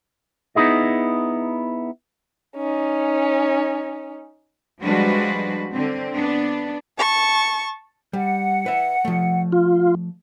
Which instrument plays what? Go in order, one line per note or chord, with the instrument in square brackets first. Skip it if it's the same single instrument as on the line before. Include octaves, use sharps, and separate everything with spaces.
[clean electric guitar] B3 D#4 E4 G#4 D#5
[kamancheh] C#4 D#4
[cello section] F3 G3 G#3 D4 F#4 B4
D3 C4
B3 D4
[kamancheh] A5 C#6
[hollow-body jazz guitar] G3 [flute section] F#5
[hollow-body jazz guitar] B4 E5
F3 A3
[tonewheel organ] F4